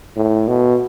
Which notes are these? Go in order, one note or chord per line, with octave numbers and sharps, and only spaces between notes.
A2
B2